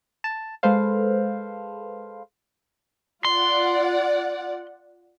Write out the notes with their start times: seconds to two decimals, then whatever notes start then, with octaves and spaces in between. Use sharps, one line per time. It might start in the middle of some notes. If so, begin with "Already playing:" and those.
0.24 A5
0.63 G#3 A4 B4 C5 F5
3.25 F4 D5 F#5 C6